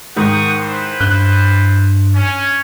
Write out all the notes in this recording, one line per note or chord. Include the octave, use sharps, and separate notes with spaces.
G#2 D#3 F#5 C#6 D#6
E4 B4 C5
G2 F#6 G7
C#4